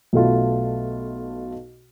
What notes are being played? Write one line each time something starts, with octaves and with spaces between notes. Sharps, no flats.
B1 B2 A3 F4